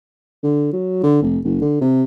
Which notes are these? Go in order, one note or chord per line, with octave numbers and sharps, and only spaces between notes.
D3
F#3
D3
F1
F#1
D3
C3